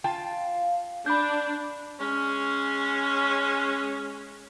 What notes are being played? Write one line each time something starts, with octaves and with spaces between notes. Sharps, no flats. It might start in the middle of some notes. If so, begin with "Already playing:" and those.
F4 F5 G5 A5
D4 B5 G6
G#3 C#4